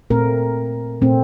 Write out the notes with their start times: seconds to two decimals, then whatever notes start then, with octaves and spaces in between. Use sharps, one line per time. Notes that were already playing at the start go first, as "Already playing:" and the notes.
0.10 A#2 A3 C4 A#4
1.02 A#2 A3 C4